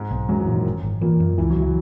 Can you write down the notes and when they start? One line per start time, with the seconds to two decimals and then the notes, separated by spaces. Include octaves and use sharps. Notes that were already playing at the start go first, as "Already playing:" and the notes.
Already playing: G#2 G#3
0.11 B1
0.29 F#2 F#3 G#3
0.41 E3
0.47 A#2
0.53 D#3
0.65 G#1
0.83 G#1
1.01 A#2 E3 A#3
1.20 F#2
1.38 C#2 E3 E4
1.50 F#3 F#4
1.56 C#2
1.62 E3 E4